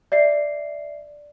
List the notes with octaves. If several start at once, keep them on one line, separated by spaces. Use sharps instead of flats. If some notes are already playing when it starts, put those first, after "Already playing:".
D5 E5 C7